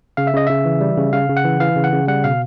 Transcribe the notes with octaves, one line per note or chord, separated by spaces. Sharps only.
C#3 F5
E5
C#3 D#5
C#3 E5
E3
G3
C#3
C#3 F5
C#3
F#5
E3
E3 F5
C#3
F#5
C#3
G3 F#5
B2 F5